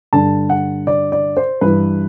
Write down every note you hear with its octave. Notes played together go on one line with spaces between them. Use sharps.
G2 D3 A5
F#5
D5
D5
C5
G2 E3 B4